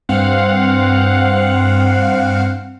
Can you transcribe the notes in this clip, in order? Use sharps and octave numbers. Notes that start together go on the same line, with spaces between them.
G2 C4 F5 F#5